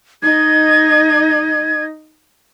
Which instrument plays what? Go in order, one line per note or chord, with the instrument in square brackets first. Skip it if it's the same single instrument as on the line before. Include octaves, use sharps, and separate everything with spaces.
[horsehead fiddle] D#4 D#5 [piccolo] G#6